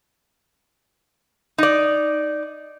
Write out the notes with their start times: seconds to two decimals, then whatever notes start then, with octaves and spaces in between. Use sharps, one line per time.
1.58 D#4 D5